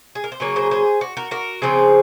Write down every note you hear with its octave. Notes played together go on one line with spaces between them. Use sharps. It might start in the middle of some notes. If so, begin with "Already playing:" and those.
G#4
A#4
C5
C#3 F#3 A#3 A#4 C#5
G#4 C5
G#4 C5
F#4
F#4 A#4
F#4 A#4
C#3 F3 C4 G#4 C5